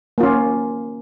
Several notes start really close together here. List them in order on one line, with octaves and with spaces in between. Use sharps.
A#3 F4 C#4